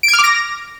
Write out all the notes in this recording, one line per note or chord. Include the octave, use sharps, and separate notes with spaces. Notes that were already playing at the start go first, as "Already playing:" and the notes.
D7
G#6
F6
D6
A#6